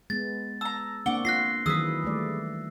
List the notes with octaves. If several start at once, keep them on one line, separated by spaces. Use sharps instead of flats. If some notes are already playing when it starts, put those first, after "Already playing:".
G#3 B3 A6
A5 A#5 E6
A#3 C4 D4 F#5 C#6 D6 G7
F4 F#6 A#6 C7
D#3 E3 F#3 G#4 B4 E6
G3 A3 D5